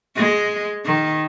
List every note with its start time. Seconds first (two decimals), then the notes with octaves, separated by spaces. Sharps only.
0.16 G#3
0.85 D#3